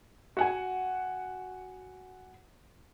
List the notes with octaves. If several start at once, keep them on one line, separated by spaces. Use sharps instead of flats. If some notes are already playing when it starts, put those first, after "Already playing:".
F#4 F#5 G#5